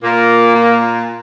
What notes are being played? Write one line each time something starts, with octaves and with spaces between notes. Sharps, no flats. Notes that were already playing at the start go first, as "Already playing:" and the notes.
A#2 A#3
A#2